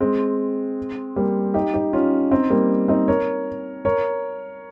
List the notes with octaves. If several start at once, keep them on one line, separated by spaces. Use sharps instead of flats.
G#3 C4
G3 A#3
D#4 G4
D#4 G4
C#4 F4
C4 D#4
G3 A#3
C4 D#4
A#4 C#5
A#4 C#5